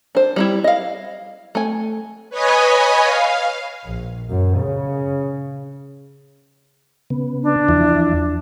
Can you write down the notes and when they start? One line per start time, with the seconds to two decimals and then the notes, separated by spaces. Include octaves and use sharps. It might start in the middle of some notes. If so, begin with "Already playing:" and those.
0.15 D4 C5
0.36 G3 D#4 E4
0.64 D#5 F5
1.55 A3 G#5
2.30 B4 C#5 D#5 G#5 B5
3.03 F5
3.86 A#1
4.30 F#2
4.59 C#3
7.10 C#3 B3
7.42 D4
7.69 E2 F3 E4